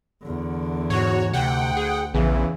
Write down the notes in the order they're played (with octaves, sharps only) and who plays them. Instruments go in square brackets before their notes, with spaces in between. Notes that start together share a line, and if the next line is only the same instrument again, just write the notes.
[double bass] E2 D3
[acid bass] G#2 [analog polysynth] F#4 C#5
[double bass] D2 [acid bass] C3 [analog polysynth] F#5 G5
[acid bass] G#4
[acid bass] A#1 [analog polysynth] E2 C#3 E3